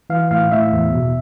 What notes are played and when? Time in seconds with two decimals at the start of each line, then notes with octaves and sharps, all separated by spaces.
0.10 E3 F5
0.31 A2 F5
0.52 A2 E5
0.72 E2
0.92 B2